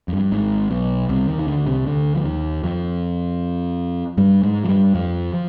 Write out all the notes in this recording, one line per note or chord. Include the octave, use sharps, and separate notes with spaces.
F2
G2
G#1 G#2
B1 B2
C2 C3
D#2 D#3
D#3
D2 D3
C2 C3
D2 D3
F3
D#2 D#3
F2 F3
G2 G3
G#2 G#3
F3
G2 G3
F2 F3
F3